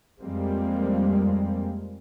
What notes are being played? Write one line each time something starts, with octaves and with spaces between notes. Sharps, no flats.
F2 G3 G#3 A#3 C4